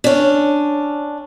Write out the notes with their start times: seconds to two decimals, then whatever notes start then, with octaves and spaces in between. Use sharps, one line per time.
0.04 C#4 D4